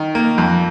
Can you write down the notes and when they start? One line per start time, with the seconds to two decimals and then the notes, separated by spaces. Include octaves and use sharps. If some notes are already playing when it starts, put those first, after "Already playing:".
Already playing: D#3
0.15 A#3
0.38 F2